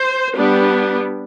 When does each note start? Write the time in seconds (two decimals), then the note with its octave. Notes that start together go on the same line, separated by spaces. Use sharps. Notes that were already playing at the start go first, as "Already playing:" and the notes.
Already playing: C5
0.35 G3 B3 D4